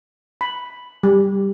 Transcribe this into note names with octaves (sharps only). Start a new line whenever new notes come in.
B5
G3